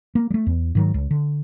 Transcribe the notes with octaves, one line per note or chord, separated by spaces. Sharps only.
A#3
G3 A3
E2
G#2 D#3 F#3
C#2
D3